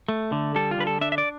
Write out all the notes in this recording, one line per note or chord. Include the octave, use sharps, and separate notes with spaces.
A3
D3
G3 A4
F4
D3 B4
A4
D4 E5
E5
D5